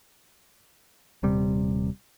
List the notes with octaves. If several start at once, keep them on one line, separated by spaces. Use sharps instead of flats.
D#1 C3 G3